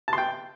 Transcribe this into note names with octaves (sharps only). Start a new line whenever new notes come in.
A5
C6
G5